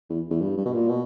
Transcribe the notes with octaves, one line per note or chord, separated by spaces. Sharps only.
E2
E2
G2
G2
B2
A#2
B2